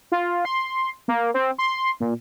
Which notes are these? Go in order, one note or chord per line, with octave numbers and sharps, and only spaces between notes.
F4
C6
A#3
C4
C6
A#2